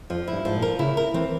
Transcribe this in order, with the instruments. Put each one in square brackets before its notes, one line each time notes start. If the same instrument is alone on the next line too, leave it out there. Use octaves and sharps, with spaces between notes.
[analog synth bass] F2 [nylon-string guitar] F3
[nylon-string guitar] E4
[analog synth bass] G2
[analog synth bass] G#2 [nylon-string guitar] F3
[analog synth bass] A#2
[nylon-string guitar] A#4
[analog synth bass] C#3 [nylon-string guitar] E4
[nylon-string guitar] A#4
[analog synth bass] E3 [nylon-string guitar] C4